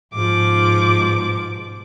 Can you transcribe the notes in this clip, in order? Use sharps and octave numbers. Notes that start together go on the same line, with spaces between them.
G#2 B2 F3 D6